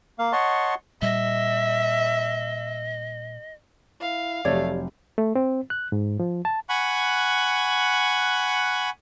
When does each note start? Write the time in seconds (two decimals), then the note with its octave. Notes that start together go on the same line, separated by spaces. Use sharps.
0.19 A#3 F5
0.32 C#5 D#5 F#5 A5 C6 C#6
1.02 A#2 G3 D#5 E5
4.01 E4 F5
4.45 F1 F#3 A3 G4 C#5 D5
5.18 A3
5.35 C4
5.70 F#6
5.92 G#2
6.20 F3
6.45 A5
6.69 F#5 G#5 B5 C#6 F#6